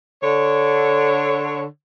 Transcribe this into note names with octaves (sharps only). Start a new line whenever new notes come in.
D3 C#5